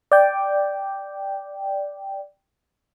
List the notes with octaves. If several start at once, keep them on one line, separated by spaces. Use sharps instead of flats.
D5 G5